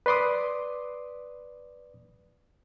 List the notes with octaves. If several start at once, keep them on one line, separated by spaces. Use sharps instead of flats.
B4 D5 C6 D6 D#6